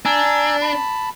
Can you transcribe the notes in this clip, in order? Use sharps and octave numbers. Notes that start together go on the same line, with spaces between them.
D4 G#5 A#5 E6
A5 B5